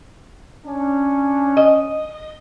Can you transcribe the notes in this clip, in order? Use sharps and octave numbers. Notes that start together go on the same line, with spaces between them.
C#4 D4
D#5